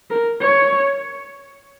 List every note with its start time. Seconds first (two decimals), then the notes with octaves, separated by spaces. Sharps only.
0.10 A#4
0.41 C#5